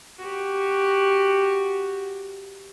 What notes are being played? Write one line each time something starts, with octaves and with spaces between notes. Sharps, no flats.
F#4 G4